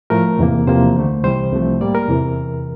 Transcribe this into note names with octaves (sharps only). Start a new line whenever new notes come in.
A2 F3 A3 A#4
E2 C3 E3 A#3
E2 C3 F3 A#3 C5
D2 D3 A3
C2 C3 E3 G3 C5
C2 C3 F3 A3
A2 G3 A#3 D5
A#4
E2 C3 E3